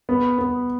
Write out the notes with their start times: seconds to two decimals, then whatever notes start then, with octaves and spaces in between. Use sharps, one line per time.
0.09 B3
0.38 B3